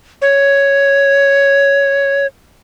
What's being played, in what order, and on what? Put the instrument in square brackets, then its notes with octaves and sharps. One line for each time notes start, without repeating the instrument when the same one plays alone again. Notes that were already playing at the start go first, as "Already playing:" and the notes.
[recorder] C#5